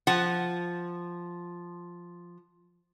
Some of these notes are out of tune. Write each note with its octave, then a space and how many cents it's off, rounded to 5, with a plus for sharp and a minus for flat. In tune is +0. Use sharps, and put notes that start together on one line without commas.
F3 +0 F#5 +0